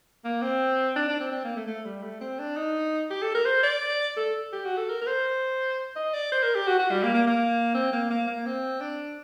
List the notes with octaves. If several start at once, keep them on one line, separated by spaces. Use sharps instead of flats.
A#3
C4
D4
D4
C4
C4
A#3
A3
A3
G3
A3
C4
D4
D#4
G4
A4
A#4
C5
D5
A4
G4
F#4
A4
A#4
A#4
C5
D#5
D5
C5
A#4
G4
F#4
F#4
G3
A#3
A#3
A#3
C4
A#3
A#3
A#3
C4
D4